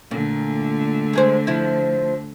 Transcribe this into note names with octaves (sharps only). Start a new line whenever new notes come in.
A#2 D3 A3
G#3 G#4 C5
F3 E4